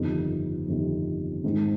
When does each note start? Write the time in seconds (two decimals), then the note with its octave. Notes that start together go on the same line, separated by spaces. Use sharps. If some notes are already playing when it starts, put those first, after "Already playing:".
Already playing: G1 F2 C3 D#3
0.67 G1 F2 C3 D#3
1.43 G#2 D#3 G#3 C4 D#4